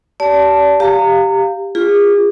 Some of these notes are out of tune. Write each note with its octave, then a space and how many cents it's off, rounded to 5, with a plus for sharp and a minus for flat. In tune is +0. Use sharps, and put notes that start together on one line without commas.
G4 -35 D5 -35 A5 +0
G4 +0 F5 +0 A#5 -30
F4 +0 G#4 -35